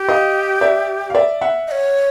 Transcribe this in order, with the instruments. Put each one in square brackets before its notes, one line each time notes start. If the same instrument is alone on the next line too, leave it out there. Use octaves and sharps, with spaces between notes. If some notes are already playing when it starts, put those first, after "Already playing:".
Already playing: [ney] G4
[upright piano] D#5 F5
D5 E5
F5
D5 E5
E5 F#5
[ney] D#5
C#5